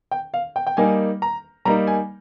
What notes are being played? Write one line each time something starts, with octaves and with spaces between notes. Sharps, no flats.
G5
F5
G5
G5
G3 A#3 D#4 G#5
A#5
G3 A#3 D#4 A#5
G#5